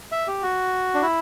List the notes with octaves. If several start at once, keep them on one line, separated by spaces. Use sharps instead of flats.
E5
G4
F#4
D4
E4